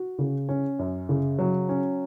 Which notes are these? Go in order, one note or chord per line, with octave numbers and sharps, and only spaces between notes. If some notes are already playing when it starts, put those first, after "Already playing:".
Already playing: F#4
C#3
C#4
F#2
C#3
F#3
C#4